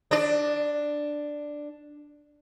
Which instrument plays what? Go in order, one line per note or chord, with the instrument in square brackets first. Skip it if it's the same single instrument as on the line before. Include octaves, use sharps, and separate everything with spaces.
[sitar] D4 D5